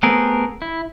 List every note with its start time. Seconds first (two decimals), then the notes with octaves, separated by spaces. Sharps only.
0.03 A3 B3 C4 G#4 A#4
0.62 E4